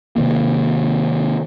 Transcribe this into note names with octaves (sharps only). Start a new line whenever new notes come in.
C3 D#3 A#3